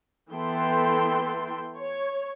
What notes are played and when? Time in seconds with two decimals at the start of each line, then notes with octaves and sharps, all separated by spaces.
0.32 E3 B3 A4 G5 C6
1.78 C#5